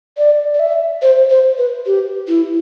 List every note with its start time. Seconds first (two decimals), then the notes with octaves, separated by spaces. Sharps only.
0.18 D5
0.54 D5
0.60 E5
1.02 C5
1.30 C5
1.58 B4
1.86 G4
2.28 E4